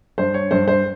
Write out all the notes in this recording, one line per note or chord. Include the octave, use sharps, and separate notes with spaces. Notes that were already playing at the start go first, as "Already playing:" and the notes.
G2 C5
C#5
G2 C5
C5